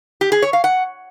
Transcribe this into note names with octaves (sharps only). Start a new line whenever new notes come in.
G4
G#4
C#5
F5
F#5